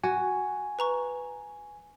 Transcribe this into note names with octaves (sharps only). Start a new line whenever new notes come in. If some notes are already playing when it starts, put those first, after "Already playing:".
F#4 G#5
B4 A#5 C#6